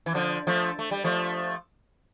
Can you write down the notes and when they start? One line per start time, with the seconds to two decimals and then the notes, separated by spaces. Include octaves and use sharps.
0.06 E3
0.14 D3 F3
0.47 F3 A3
0.79 A3
0.91 G3
1.04 F3 A3